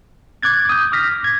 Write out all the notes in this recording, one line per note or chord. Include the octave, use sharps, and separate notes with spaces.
D6 F#6 G#6 A6
D#6 G6
D6 F6 A#6 B6
G#6